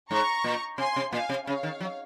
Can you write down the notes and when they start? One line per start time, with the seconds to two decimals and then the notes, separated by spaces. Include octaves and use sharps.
0.11 G#2 A#5 C#6
0.44 A#2
0.78 C3 G#5 C6
0.96 C3
1.12 A#2 F5 G#5
1.29 C3
1.46 C#3 C#5 F5
1.63 D#3
1.81 F#3